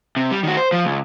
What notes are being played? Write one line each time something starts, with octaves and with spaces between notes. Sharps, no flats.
C3
G3
D#3 F#4
C5
F3
C#2